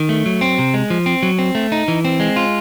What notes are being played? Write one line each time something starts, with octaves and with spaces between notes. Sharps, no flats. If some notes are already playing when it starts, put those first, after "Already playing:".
Already playing: D#3
A3
F#3
C4
C3
G#3
F3
C4
F#3
C4
A3
D#4
E3
C4
G#3
F4